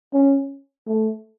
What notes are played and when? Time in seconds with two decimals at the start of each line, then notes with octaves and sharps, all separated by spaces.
0.13 C#4
0.87 A3